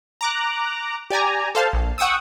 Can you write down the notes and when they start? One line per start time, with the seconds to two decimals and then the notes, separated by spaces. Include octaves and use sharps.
0.21 A#5 D6 F#6
1.10 G4 D5 G#5 A#5
1.55 A4 C5 F5 A5
1.73 A#1
1.98 F#5 G5 C#6 D#6 E6